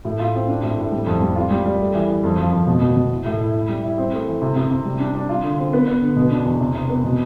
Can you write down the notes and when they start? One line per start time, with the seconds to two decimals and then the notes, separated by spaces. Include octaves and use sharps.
0.05 A2
0.20 F4
0.34 C4
0.49 D4
0.63 A2
0.78 A2
0.92 G3
1.07 F2
1.22 G3
1.36 F4
1.51 G3
1.65 G3
1.79 A3
1.95 E3
2.10 E3
2.24 F2
2.38 F3
2.53 F2
2.67 B2
2.82 B2
2.96 B2
3.11 E4
3.26 A2
3.41 E4
3.55 E4
3.69 G3
3.83 E4
3.98 C4
4.13 A3
4.27 E3
4.42 C3
4.56 C3
4.71 C3
4.85 G3
5.00 D4
5.15 D4
5.29 F4
5.43 D3
5.58 C4
5.73 B3
5.87 B3
6.02 D3
6.16 B2
6.31 D4
6.45 E2
6.60 C3
6.75 C3
6.89 B3
7.04 B2